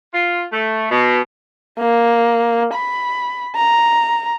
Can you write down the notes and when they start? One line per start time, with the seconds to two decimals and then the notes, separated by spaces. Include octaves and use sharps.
0.13 F4
0.51 A3
0.90 B2
1.79 A#3
2.74 B5
3.56 A#5